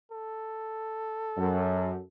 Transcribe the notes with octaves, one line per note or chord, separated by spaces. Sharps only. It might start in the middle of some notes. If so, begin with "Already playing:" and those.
A4
F#2